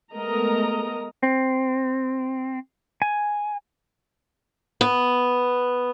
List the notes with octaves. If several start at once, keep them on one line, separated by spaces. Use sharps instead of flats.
G#3 A3 B3 A#4 D#5 A#5
C4
G#5
B3